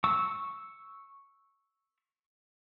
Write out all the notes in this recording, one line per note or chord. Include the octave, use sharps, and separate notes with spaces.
C#6 E6